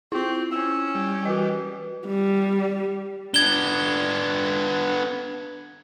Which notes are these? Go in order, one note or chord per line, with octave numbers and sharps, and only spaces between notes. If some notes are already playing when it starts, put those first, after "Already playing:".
C4 E4 F4
C#4 E6
G3
E3 F#4 D#5
G3
B3 D4 G#6 G7